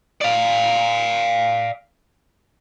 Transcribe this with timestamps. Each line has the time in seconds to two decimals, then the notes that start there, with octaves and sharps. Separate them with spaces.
0.21 D5 F5